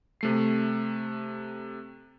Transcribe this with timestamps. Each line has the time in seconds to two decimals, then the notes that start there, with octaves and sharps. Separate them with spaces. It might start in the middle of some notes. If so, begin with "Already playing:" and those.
0.21 C3 A3 C7